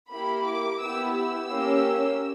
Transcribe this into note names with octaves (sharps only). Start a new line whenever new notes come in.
A#3 E4 G4 B5
D6
B3 E4 G4 E6
E6
A#3 C#4 G4